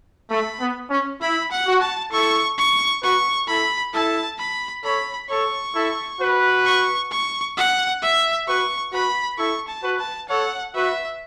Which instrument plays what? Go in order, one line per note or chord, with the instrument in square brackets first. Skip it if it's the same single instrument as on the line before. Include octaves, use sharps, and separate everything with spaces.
[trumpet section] A3 [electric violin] B5
[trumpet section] B3
C#4
[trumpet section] E4 [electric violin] B5
[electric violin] F#5
[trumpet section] F#4
[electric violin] A5
[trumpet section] E4 A4 [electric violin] C#6
[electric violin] C#6
[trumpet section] F#4 B4 [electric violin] C#6
[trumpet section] E4 A4 [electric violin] B5
[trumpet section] E4 A4 [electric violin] A5
[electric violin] B5
[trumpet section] A4 C#5 [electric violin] B5
[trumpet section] A4 C#5 [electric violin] C#6
[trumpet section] E4 A4
F#4 B4
[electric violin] C#6
C#6
F#5
E5
[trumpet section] F#4 B4 [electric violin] C#6
[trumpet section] F#4 B4 [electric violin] B5
[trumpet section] E4 A4 [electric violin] C#6
[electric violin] A5
[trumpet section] F#4 B4
[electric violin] A5
[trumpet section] A4 C#5 [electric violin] F#5
[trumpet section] F#4 B4 [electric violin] E5